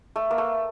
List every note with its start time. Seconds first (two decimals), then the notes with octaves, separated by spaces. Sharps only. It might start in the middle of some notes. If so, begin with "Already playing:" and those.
0.16 A3
0.31 A#3
0.38 A3